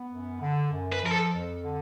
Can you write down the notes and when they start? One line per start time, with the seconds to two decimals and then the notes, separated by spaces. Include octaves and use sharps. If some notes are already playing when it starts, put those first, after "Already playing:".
Already playing: B3
0.10 F#2
0.40 D3
0.71 F#2
0.92 B4
1.02 F3 A#4
1.11 A4
1.33 F2
1.62 D3